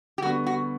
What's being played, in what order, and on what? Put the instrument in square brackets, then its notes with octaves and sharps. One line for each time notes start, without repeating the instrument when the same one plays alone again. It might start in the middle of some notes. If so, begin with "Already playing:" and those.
[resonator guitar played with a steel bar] G4
[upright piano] D3 G3 B3 [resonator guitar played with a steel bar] F#4
[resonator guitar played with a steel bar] F#4